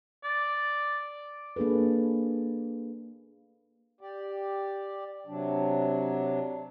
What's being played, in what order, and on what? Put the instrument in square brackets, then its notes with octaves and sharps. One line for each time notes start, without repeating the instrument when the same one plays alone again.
[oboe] D5
[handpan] A#3 D4 G#4 A4 B4
[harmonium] G4 D5
C3 F#3 D4